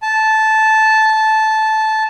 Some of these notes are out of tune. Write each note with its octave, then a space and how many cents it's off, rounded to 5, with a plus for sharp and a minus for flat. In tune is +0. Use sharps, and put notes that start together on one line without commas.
A5 -10